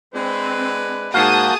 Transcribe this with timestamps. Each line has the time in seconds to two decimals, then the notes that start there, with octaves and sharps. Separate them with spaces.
0.14 G#3 C4 D4 B4
1.14 G#2 A#3 F#4 G#4 F5 A5 D#6 G6